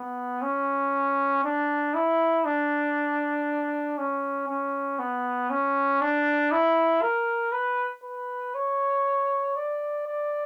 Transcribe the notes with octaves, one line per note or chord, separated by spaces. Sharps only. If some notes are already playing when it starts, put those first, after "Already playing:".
Already playing: B3
C#4
D4
E4
D4
C#4
C#4
B3
C#4
D4
E4
A#4
B4
B4
C#5
D5
D5